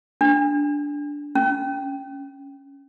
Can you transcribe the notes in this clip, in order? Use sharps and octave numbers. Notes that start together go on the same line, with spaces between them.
D4
C#4